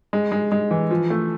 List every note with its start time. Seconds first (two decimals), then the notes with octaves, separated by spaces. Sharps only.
0.13 G#3
0.32 G#3
0.52 G#3
0.71 E3
0.91 F3
1.10 A3